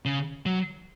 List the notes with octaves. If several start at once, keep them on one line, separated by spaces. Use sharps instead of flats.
C#3
F#3